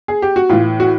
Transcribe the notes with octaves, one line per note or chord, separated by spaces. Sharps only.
G#4
G4
F#4
A2 E3 F4
F#4